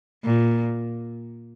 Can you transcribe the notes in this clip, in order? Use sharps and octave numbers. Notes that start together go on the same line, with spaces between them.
A#2